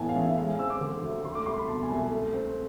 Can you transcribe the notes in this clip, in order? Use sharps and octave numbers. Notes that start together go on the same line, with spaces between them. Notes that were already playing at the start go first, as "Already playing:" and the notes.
Already playing: A1 A2 E3 B3 G#5 A5
F5
A1
E5
G#3 F5
G#5
C4 E6
D6
D3
D2
A3 C6
D6
C2 C6
B5
B2 A5
G#5
C2
A3
C4